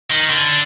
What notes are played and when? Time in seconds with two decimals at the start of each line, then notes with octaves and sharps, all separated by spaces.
0.10 D#3
0.30 D3